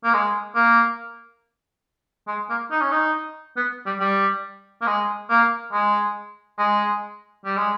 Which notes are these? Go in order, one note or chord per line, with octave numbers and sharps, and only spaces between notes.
A#3
G#3
A#3
G#3
A#3
D#4
C#4
D#4
B3
G3
G3
A#3
G#3
A#3
G#3
G#3
G3
G#3